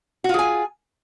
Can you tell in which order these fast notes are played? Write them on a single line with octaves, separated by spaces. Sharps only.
F#4 F4 G#4 G#5